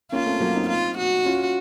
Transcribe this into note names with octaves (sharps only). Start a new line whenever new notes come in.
A#3 C#4 F4
A3 C4
F#3 A#3
C4 D#4
F4
F#4
C#4 F4